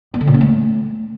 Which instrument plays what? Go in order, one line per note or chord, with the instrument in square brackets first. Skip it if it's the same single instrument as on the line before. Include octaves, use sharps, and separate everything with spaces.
[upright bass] B3
D3
A#2
C#4
A3